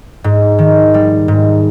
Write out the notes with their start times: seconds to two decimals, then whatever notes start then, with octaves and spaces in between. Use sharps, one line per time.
0.24 G#2
0.59 D#3
0.94 G3
1.28 G#2